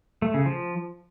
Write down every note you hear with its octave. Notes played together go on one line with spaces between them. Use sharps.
A3
C#3
F3